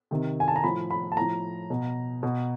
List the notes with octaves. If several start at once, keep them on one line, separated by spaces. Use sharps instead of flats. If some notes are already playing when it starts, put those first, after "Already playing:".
C3 D#3
G#5
A5
A#5
A2 F3 B5
B5
A5
A2 F3 A#5
B2
B2